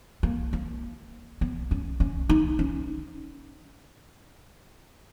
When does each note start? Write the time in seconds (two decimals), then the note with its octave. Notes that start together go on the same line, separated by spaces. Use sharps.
0.23 A#3
0.53 A#3
1.41 B3
1.71 C#4
2.00 C#4
2.29 D#4
2.59 C#4